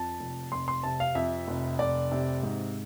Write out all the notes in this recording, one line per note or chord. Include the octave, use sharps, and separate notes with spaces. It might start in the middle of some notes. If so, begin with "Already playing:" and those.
Already playing: F2 A5
F1
F1 C6
C6
C3 A5
F5
F2 E5
F1
F1 D5
C3
G#2